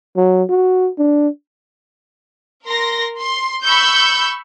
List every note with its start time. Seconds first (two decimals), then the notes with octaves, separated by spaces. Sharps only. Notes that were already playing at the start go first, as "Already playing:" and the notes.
0.16 F#3
0.49 F#4
0.98 D4
2.66 A#4 C6 A#6
3.18 C6
3.64 B5 C#6 E6 G6